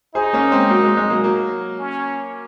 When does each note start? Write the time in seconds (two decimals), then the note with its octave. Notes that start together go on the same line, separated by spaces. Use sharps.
0.15 D#4 G#4 C5
0.33 A#3 C#4
0.51 G#3 C4
0.69 F#3 A#3
0.83 G#3
0.97 G#3
1.10 F#3 A#3
1.24 F#3 A#3
1.79 C#4